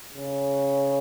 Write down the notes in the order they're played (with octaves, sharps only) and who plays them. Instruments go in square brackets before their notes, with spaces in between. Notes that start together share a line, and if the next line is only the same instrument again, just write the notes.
[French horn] C#3